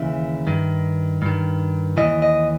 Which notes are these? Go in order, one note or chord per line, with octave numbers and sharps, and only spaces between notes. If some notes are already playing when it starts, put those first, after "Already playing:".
Already playing: D#2 C#3 E3 E5
G2 D#3
G2 D#3
D#2 C#3 E3 D#5
D#5